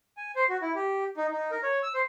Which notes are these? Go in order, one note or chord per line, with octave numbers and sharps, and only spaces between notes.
G#5
C5
F#4
E4
G4
D#4
D#4
A#4
C#5
E6
C5